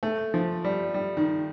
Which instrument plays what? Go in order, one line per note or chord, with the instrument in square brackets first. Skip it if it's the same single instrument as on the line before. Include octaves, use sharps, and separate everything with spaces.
[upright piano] A3
F3
G3
G3
D#3